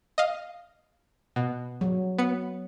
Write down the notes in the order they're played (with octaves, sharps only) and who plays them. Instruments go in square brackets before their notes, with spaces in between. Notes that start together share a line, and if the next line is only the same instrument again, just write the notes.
[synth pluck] D#5 F5
B2
[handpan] F#3
[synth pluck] B3 C#7